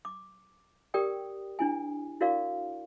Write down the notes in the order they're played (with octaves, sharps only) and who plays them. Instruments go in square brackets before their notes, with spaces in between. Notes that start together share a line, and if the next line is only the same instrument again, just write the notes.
[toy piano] D6
G4 A#4 D5 G5 D#6
D4 E4 G#5
E4 F#4 A#4 D5 F5 C#6